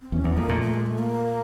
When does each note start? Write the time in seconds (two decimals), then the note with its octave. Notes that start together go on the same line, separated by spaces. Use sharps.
0.01 C4
0.12 E2 C#4
0.24 E2 B3
0.37 F2 A#3
0.49 A#2 A3
0.62 A3
0.74 G#3
0.86 A3
0.98 A#3